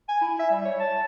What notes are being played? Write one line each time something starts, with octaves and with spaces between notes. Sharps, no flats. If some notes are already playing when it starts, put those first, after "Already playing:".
G#5
E4
E5
G3
C#5
A5